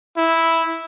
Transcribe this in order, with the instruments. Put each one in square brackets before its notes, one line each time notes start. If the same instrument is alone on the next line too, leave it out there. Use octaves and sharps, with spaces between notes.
[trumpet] E4